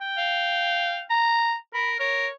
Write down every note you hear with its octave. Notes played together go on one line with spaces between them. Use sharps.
G5
F5
A#5
A#4 B5
A#4 C#5